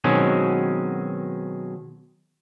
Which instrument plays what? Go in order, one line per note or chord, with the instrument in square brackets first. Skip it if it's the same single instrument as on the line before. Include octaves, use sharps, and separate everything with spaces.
[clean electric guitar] B2 D#3 F#3 G#3 C4 C#4